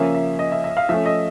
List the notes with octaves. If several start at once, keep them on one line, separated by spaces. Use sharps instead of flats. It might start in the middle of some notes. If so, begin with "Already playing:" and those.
Already playing: C#3 F3 A#3 C#4 E5
E5
D#5
E5
E5
F5
F3 A3 C#4 E5
D#5